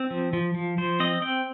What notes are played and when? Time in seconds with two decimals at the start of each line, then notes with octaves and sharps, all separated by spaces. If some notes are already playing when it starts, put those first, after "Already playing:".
Already playing: C4
0.10 F3
0.33 F3
0.54 F3
0.78 F3 C5
1.00 C4 D#5
1.22 C4 G5